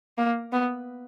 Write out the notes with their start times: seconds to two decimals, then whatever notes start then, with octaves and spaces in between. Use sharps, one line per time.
0.18 A#3
0.52 B3